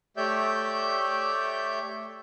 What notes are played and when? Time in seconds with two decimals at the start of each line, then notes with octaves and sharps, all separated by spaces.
0.17 A3 G4 C#5 D5 E5 G6